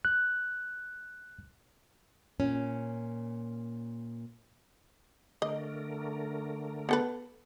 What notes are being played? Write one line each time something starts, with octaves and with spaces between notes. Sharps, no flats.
F#6
A#2 C#4
D3 A3 A#4 D#5
B3 A4 B4